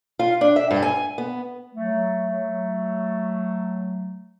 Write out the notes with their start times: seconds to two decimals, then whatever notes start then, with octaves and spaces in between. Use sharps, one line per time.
0.19 F4
0.41 D4
0.56 E5
0.71 G2
0.82 G#5
1.18 B3
1.74 F#3 A3